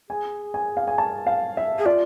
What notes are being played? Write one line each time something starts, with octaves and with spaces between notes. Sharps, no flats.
G#4 G#5
G#5
F5
G#5
A5
F5
E5
G#4
F4 D5